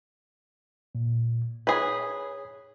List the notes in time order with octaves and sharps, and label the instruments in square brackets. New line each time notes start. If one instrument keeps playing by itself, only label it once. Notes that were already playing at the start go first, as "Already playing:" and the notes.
[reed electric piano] A#2
[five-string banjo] G#4 B4 [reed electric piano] C#5